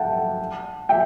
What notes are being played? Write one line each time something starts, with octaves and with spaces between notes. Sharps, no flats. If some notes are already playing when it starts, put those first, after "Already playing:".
Already playing: E5 F#5 G5 A5
E5 G5